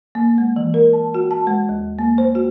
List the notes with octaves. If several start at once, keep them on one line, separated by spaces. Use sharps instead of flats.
A#3
G#3
E3
A#4
A5
F#4
A5
G#3
D#2
A#3
C5
F#4